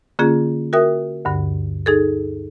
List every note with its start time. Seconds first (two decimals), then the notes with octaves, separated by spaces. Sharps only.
0.19 D3 A#3 C#4 F4 G#4
0.73 F#4 A#4 E5 G5 D#6
1.25 D2 G2 D3
1.86 D#4 G#4 A4